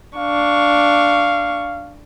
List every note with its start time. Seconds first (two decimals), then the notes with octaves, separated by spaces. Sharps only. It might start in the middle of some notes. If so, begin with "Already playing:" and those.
0.18 D4 F5 C#6